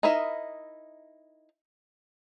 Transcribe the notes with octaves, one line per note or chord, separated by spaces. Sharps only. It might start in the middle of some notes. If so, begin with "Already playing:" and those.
D#4 E4 A#4 D#5 E5